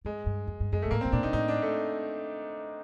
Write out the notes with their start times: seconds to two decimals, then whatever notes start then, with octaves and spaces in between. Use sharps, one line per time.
0.05 G2 G#3
0.26 G2
0.47 F#2
0.60 G2
0.72 F#2 G#3
0.82 A#2 A3
0.91 A2 A#3
1.01 A2 C4
1.12 A#2 D4
1.23 A#2 D#4
1.33 A2 D#4
1.48 D4
1.62 A3